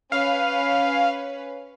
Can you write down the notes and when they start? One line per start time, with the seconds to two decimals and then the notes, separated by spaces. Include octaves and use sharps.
0.12 C#4 B4 F5